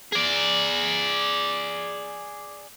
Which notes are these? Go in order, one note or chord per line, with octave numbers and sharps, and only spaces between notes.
G#4 D5